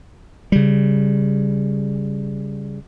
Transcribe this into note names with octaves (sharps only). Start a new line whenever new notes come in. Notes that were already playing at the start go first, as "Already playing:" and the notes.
C#3 G3